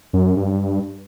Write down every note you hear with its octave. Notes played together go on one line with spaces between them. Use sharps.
F#2
G2